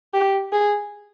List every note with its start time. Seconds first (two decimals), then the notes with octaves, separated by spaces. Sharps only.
0.14 G4
0.53 G#4